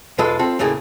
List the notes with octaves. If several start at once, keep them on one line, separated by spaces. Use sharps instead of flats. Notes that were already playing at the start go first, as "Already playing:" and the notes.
B1 E2 G#3 F4 A4 B4
C4 F4 A4
D#2 A2 C#3 A#3 G#4